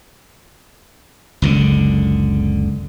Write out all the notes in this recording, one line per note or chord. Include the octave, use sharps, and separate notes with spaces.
F#1 C#2 D3